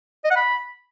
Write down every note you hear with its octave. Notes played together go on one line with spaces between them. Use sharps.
D#5
F#5
B5